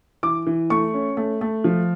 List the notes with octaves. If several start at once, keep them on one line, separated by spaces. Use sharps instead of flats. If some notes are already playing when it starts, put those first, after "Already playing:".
E3 D6
E3
A3 C#6
C#4
A3
A3
F3